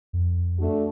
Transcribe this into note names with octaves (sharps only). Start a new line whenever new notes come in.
F2
A3 D4 F#4